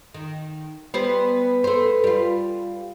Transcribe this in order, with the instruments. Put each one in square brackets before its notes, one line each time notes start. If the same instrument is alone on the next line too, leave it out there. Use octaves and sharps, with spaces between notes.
[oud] D#3
[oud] G3 B3 C5 [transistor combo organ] B4
[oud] A3 C5
G3 F4